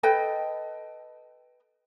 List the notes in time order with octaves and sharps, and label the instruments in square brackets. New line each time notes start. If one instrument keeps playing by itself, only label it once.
[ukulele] A4 B4 D#5 G5